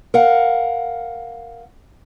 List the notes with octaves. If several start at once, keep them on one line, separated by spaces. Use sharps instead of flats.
A#4 F5 F#5